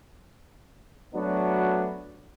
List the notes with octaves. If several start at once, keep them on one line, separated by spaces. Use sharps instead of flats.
F#3 A3 B3 D4 F#4